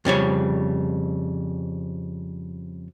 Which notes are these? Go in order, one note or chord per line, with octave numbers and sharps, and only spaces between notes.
F2 C#3 G3 C#5